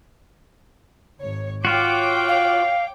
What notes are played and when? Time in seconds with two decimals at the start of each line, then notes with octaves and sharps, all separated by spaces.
1.17 G#1 C#5
1.65 F4 F#4 C#5 G5 D6
2.28 F5